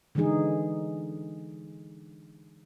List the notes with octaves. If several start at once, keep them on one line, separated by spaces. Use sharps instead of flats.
D3 E3 G#3 D#4 G#4